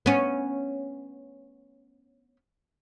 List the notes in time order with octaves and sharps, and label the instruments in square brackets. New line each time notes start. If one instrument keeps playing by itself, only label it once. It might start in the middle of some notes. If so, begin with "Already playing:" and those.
[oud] B3 C#4